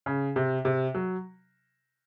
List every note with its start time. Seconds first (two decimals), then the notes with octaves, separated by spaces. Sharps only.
0.06 C#3
0.36 C3
0.65 C3
0.95 F#3